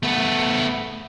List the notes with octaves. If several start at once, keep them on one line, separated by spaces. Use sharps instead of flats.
A3 B3